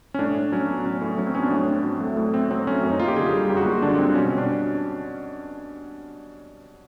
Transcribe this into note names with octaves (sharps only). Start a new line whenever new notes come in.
C#4
A2 D4
A2
F#3 C#4
B3
A2 C#4
A2
F#3 C#4
C4
B3 C#4
D4
A2
C4
F#3
A3
A2
C4
F#3 C4
A3 C#4
F#2
D#4
A#3 F4
G4
D3 G#4
G3
F#2 G4
F#4
A#3 F4
D3 D4
G3 C4
B2 C#4
C#4
B2
D4